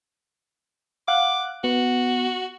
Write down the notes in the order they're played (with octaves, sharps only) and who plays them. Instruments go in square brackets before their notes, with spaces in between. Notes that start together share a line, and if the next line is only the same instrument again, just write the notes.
[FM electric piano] F5 F#5 F#6 [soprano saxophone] D6
[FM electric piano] B3 [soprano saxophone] F#4